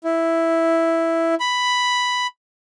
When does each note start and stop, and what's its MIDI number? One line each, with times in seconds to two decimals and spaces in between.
0.04 1.35 64
1.40 2.27 83